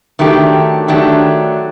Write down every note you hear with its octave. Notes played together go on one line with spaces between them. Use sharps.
D#3 F#3 A3 D4 G4
D#3 F#3 A3 D4 G4